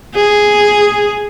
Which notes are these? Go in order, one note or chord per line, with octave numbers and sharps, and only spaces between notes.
G#4